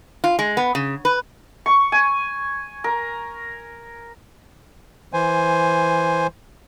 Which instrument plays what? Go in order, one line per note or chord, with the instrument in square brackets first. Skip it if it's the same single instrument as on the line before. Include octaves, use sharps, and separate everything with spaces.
[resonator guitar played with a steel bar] F4
G#3
B3
C#3
B4
[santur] C#6
G#5
A#4
[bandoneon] E3 C5 G#5